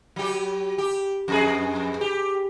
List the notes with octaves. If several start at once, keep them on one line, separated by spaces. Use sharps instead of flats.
F#3 G4
G4
F2 G#4
G4